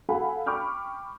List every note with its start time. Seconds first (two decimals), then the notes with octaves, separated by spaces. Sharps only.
0.09 A4 F5 F#5 G#5 B5
0.46 G5 B5 C#6 D6 F6 G6